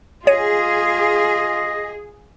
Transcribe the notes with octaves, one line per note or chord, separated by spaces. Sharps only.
F4 G#4 C#5 D#5 D#7